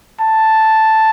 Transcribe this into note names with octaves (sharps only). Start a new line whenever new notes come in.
A5